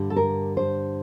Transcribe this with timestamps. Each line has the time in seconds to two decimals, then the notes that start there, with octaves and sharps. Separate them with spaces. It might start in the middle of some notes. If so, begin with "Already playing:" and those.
Already playing: G2 D3 G3
0.10 A4
0.16 A#4
0.57 C5